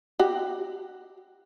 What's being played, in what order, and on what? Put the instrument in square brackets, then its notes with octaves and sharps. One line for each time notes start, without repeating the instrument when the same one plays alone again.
[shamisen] F#4 G4